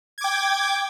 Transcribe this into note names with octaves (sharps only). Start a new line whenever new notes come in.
G5 D6 G#6